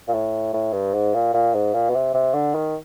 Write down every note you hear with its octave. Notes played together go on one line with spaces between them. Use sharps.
A#2
A2
A2
G2
G#2
A#2
A#2
G#2
A#2
B2
C3
C3
D3
D#3